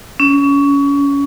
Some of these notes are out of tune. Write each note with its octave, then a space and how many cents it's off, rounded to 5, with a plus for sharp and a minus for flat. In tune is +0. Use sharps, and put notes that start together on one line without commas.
C#4 +25